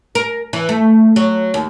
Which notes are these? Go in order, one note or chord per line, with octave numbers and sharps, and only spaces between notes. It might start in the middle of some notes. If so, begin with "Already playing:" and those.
A#4
E3
A3
F#3
D#2